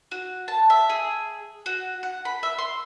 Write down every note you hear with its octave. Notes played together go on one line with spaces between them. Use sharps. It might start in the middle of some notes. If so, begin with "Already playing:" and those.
F#4
A5
E5
G#4
F#4
F#5
B5
E5
C6